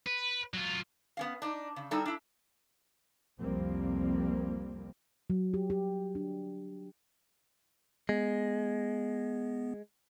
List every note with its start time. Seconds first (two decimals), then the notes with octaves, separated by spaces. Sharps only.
0.06 B4
0.54 F#3 F4
1.17 B3 C#4 F5
1.42 D4 D#4
1.76 C#3
1.91 G3 D#4 E4 A4
2.06 D4 E4
3.40 C2 F2 F3 G3 A#3 C4
5.30 F#3
5.54 G4
5.70 G4
6.15 D4
8.09 G#3 B3